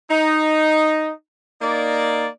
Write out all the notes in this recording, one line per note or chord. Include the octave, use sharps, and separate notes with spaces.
D#4
A#3 D#4 D5